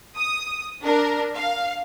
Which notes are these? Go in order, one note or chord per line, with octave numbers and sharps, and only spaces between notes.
D#6
D4 A#4
F5